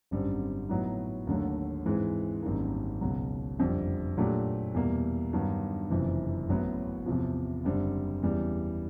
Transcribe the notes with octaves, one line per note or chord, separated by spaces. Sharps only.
G#1 F#2 D3 G3 C4
A2 F#3 B3 D#4
D#2 D3 F#3 A3
G#2 E3 G#3 C4
G#1 F#2 D#3 G3 A#3
C#2 B2 F#3
F#1 F2 D3 G3
A#2 F#3 A3 D4 G4
E2 B2 G3 A#3
G2 D#3 F#3 B3
F#1 F2 C3 E3
A1 A2 F#3 B3
E2 C3 F3
F#1 F#2 D3 G3 C4
E2 C#3 E3 G3